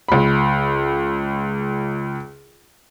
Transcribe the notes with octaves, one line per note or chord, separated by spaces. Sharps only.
C#2 B5